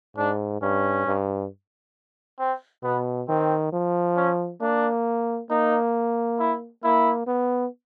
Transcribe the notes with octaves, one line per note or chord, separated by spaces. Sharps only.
G#2 D4
G2 C#4
G2
C4
B2 B3
D#3 C4
F3
C#4
A#3 D4
A#3 D#4
E4
A#3 E4
B3